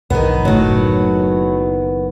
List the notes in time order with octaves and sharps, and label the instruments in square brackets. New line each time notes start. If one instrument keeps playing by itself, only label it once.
[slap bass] B1 G#2 E3 [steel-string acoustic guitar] D#3 B3
[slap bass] F#1 [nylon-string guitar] A2 F#3